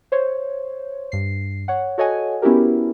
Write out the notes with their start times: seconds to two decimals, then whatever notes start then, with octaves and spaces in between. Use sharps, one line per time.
0.12 C5 C#5
1.12 G2 C7
1.68 C#5 F#5
1.98 F#4 A4 C#5 D#5 F#5 G#5
2.42 B3 C#4 E4 F#4 G4 A#4